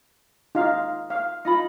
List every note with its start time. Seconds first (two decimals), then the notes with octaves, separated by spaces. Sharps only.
0.55 D#4 F4 F5
1.10 F5
1.45 D#4 F4 B5